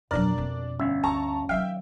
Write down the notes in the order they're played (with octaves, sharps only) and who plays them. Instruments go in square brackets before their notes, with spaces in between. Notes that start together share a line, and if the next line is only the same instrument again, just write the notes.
[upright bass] D1 F#3 [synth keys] F2 B2 [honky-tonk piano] D4 D5 [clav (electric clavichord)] A#4
[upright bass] A3 C4
[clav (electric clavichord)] G1 E5 [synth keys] C#4
[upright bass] D2 [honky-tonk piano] A5 A#5 C#6
[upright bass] D#3 F#3 [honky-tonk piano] E5 G5 [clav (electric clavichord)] F5